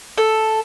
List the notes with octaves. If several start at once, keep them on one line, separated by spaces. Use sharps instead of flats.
A4